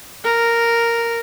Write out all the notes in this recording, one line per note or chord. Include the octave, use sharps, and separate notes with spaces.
A#4